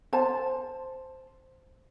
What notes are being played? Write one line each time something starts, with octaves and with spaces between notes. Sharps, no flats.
C5 A5